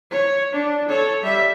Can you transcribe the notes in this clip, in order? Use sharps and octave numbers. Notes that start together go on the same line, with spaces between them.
C#5
D4
A4 C#5
G3 E5